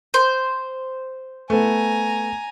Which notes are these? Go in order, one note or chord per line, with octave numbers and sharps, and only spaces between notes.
C5
A3 B3 G#5 A#5